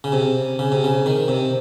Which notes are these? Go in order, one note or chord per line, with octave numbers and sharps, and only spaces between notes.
C#3
C3
C#3
C3
C#3
D#3
C3